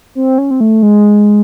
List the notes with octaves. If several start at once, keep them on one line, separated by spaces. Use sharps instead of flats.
C4
C#4
C4
A3
G#3